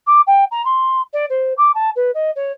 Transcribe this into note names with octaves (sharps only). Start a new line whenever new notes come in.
D6
G5
A#5
C6
D5
C5
D6
A5
B4
D#5
C#5